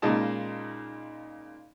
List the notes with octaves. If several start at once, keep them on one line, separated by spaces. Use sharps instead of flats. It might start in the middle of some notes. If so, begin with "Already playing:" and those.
A#2 C#3 G#3 D#4 D#5 A5